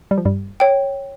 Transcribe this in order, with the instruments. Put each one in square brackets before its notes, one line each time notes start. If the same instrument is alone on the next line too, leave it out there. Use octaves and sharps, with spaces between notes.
[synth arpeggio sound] G3
F3
G2 G3
[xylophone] C#5 G5